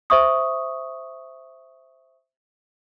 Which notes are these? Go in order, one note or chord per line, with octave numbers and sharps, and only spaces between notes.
C5 E5 C#6 D#6